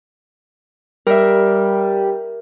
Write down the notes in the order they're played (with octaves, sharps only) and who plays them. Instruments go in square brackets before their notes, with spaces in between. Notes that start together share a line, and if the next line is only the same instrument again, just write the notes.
[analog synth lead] G3 [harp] A#4 E5